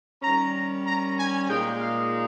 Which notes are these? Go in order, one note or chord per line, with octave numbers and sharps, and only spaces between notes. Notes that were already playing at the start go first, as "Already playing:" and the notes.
D#3 G3 C#4 A#5
A#5
G#5
A#2 G#3 D#4 G5
F5